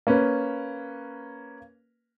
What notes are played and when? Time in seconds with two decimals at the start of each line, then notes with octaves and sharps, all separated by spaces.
0.07 A#3 C#4 B4